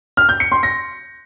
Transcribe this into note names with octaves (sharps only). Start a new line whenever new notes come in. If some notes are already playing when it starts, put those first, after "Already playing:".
F6
G6
C#7
C6
A#6